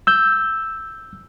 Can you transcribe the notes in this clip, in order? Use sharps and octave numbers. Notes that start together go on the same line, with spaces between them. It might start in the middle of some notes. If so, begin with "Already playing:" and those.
E6 G6